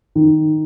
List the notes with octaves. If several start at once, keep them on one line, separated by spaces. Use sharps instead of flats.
D#3